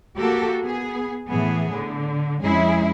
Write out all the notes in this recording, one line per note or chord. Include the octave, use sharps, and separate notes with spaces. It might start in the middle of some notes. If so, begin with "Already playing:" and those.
A#3 F#4 G4 A4
B3 G#4
A2 E3 B3 G#4
D3
F2 G#3 C#4 E4 G#4